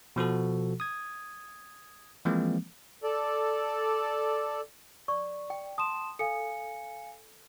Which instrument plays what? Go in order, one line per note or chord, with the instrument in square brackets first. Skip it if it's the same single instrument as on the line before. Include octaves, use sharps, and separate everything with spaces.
[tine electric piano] B2 F3 F#4 A4
D#6 G#6
E3 F3 G#3 A#3 C4
[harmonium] A4 D5
[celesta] D5 [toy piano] C#6
[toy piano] G5
[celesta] A5 C6 E7 [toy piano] D#6
[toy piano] A4 [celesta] F5 G#5 C#7